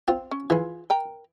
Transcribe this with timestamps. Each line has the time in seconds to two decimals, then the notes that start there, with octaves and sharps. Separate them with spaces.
0.08 C4 F4
0.31 C#4
0.50 E3 F4 G#4
0.90 A#4 G5 A#5